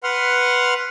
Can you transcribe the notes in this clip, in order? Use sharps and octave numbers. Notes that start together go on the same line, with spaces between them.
B4 F#5 C6 F6